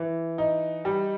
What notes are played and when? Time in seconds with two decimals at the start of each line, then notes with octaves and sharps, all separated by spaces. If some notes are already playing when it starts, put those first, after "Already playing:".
Already playing: E3
0.38 D#4
0.85 G3